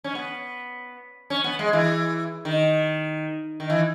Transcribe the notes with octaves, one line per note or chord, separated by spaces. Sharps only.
C#4
B3
C#4
B3
G#3
E3
D#3
D#3
E3